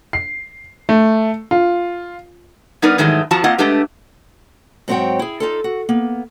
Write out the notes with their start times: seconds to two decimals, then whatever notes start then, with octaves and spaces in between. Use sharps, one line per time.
0.13 C7
0.89 A3
1.51 F4
2.82 G3 B3 D#4 A#4 B4 D5
2.98 G#2 D#3 E3 F#3 G#3 A3
3.31 F2 F3 F#4 A5 A#5
3.44 A#3 C4 F4 D#5 F#5
3.58 G#3 A3 D4 G4 B4
4.88 G#2 F#3 C4 C#5 F#5 G5
5.19 E4 G#4
5.40 D#4 F4 A4
5.64 F#4
5.89 A#3 B3